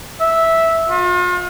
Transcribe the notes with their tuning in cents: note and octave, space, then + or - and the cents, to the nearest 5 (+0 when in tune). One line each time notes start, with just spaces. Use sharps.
E5 -5
F4 +40